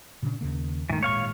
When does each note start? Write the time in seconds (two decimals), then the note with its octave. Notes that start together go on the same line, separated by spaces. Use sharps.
0.23 A#2 C#3 D4
0.41 D#2 C#3 A#3
0.89 G#2 D#3 E3 A3
1.03 G#1 A#2 G#3 C#5 F5 C#6